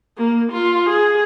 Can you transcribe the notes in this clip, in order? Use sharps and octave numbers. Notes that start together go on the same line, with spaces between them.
A#3
F4
G#4